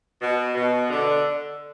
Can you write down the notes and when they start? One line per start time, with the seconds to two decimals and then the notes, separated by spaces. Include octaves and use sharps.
0.20 B2
0.55 B2
0.90 D3